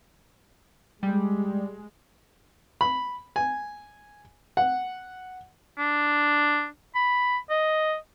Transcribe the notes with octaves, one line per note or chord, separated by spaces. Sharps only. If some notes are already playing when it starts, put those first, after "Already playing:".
G3 G#3
B5
G#5
F#5
D4
B5
D#5